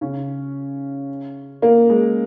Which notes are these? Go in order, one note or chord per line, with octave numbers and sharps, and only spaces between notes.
C#3 C#4
A#3
G#3